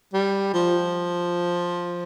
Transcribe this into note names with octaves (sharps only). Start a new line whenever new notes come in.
G3
F3